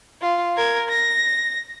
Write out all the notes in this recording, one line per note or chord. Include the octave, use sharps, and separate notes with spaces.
F4
A#4 G#6
A#6